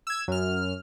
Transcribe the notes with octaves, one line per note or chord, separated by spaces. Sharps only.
E6 G#6
F#2 F6